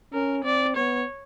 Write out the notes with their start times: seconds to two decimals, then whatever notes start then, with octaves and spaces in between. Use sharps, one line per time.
0.13 C#4 A#4
0.44 C4 D5
0.76 B3 C#5